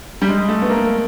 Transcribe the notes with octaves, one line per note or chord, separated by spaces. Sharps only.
G3
G#3
A3
B3
A#3